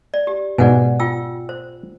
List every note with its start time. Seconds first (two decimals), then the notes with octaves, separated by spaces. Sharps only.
0.14 D5
0.27 G4
0.58 G#2 B2 D5 F#5 G#5
1.00 F4 G5 E6
1.49 C5